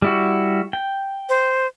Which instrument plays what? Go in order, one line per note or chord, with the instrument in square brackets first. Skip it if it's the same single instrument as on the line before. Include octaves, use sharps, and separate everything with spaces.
[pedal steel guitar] G3 E4 F#4
G5
[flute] C5